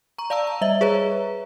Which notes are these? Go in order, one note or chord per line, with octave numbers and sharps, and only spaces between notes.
A#5 C#6
D5 F5 A5 A#5 E6
A#5
G3 D#5 E5
G#4 B4 C#5 E5 A#5